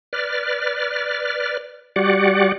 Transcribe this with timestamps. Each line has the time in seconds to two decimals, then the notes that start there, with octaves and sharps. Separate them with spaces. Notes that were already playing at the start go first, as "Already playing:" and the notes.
0.13 B4 D5 F6
1.96 G3 F#4 G4 D5 F#5